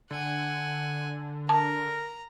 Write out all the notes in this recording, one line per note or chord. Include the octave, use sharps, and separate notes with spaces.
D3 F#5 G#5
A#4 A5 A#5